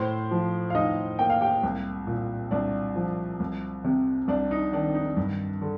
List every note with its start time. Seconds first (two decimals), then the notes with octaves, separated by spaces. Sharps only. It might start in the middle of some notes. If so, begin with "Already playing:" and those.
Already playing: A2 C5 C6
0.31 F3
0.70 F5
0.75 A2 D#4 D#5
1.19 A#3 G5
1.30 F5
1.41 G4 G5
1.63 C2
2.07 A#2
2.51 C2 D4
2.96 F3
3.40 C2
3.84 C3
4.28 C2 D4
4.51 D#4
4.73 D#3 D4
4.95 D#4
5.17 G2
5.62 D3